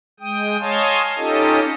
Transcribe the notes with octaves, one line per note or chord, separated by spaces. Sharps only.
G#3 G5 D#6
C#5 D#5 F5 G#5 A5 C6
C#4 D#4 F4 G4 A4 D#5